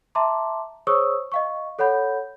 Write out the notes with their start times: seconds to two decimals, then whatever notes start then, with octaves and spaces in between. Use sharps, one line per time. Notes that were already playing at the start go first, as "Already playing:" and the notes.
0.15 E5 A5 A#5 C6 D6
0.87 G#4 C5 C#5 C#6 D#6 E6
1.32 D#5 F5 C#6
1.79 A4 C#5 F#5 B5 G6